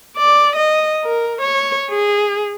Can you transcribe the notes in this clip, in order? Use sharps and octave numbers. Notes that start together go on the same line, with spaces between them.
D5
D#5
A#4
C#5
G#4